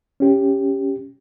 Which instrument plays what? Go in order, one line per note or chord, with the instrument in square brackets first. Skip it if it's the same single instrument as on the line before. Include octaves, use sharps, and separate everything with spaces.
[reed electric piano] C#4 G4